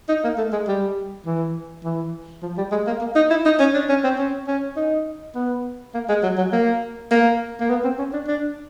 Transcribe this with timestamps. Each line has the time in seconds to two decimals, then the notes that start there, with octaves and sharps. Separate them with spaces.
0.09 D#4
0.24 A#3
0.38 A3
0.52 G#3
0.68 G3
1.26 E3
1.84 E3
2.42 F3
2.57 G3
2.71 G#3
2.87 A#3
3.01 A#3
3.15 D#4
3.30 E4
3.45 D#4
3.59 C#4
3.74 D4
3.89 C#4
4.04 C4
4.18 C#4
4.47 C#4
4.77 D#4
5.35 B3
5.94 A#3
6.09 G#3
6.23 F#3
6.38 F#3
6.52 A#3
7.11 A#3
7.60 A#3
7.69 B3
7.84 C4
7.98 C#4
8.13 D4
8.28 D4